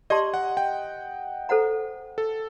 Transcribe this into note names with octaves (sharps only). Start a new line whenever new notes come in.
G4 D5 D#5 A5 C6
F#5
G5
A4 C5 F#5 A#5
A4